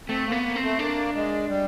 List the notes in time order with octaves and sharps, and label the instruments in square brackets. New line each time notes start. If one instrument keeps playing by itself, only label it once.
[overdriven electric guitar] A3 [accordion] C4
[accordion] A#3
[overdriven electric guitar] B3
[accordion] A#3
[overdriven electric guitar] C4
[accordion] A3
[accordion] A#3 [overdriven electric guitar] D4
[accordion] G#3
G3